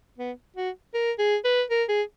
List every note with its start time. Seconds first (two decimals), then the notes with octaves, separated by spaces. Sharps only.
0.18 B3
0.56 F#4
0.94 A#4
1.19 G#4
1.44 B4
1.70 A#4
1.89 G#4